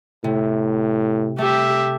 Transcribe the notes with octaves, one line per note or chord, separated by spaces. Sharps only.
A2 C3
A3 G4 E5